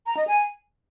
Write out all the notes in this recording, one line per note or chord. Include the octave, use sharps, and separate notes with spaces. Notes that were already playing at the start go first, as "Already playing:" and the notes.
A#5
D#5
G#5